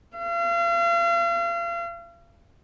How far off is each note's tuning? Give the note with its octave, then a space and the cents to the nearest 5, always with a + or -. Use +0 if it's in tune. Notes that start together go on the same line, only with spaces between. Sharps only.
F5 -40